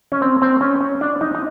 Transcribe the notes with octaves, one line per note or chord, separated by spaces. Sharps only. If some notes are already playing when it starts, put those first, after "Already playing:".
C#4
C4
C4
C#4
C#4
D4
D#4
D#4